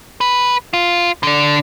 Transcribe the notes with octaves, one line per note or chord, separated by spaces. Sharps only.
B4
F4
D3 D4